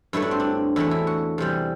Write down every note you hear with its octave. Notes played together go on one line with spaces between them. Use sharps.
G2 F#3 A3 E4
D4
C4
D4
E2 D3 F#3 A3 E4
E4
F#4
E2 C3 G3